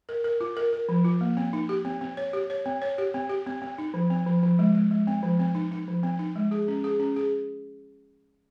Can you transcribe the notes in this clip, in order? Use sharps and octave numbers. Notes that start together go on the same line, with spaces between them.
A#4
A#4
F4
A#4
A#4
F3
F4
A#3
C4
D#4
G4
C4
C4
C#5
G4
C#5
C4
C#5
G4
C4
G4
C4
C4
D#4
F3
C4
F3
F3
G#3
G#3
G#3
C4
F3
C4
D#4
D#4
F3
C4
D#4
G#3
G#4
C#4
G#4
C#4
G#4